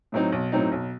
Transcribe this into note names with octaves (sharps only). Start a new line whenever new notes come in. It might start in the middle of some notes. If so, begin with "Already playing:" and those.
A2 F#3 C4 D#4
B1
A2 F#3 C4 D#4
B1